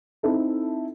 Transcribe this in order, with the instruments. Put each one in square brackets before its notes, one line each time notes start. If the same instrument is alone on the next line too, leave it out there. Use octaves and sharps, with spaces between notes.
[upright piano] C4 D#4 E4 A4